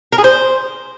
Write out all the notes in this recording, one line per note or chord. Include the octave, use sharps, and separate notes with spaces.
A#4
G#4
C5